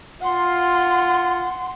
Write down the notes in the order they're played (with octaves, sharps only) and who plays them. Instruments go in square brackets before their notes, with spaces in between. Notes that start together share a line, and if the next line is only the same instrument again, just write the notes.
[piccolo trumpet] F4 [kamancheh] F#5 C6